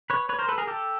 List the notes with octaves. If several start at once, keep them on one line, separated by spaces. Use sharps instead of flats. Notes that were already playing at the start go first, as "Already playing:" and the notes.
B4 C#5
B4 C#5
A#4 C5
A4 B4
G#4 A#4
G4 A4